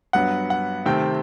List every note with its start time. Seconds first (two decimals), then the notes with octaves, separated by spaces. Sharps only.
0.13 G2 F#3 B3 F#5
0.50 F#5
0.86 C3 D#3 A3 C4 G5